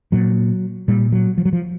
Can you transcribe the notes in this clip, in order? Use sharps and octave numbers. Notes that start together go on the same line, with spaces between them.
A#2 F#3
A#2 G3
F#3
F3
F#3
F3